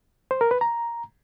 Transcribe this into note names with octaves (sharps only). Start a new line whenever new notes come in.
C5
A#4
B4
A#5